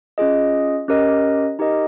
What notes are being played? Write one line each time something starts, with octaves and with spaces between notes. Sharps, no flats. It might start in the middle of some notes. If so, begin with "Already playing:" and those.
C#4 F4 G#4 D#5
C#4 G4 A#4 D#5
D#4 G4 A#4 D#5